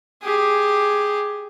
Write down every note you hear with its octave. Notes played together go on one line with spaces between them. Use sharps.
G4 G#4